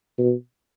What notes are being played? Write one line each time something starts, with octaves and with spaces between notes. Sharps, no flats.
B2